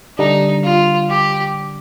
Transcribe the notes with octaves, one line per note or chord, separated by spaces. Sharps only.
D3 G3 D4 D#4
F4
G4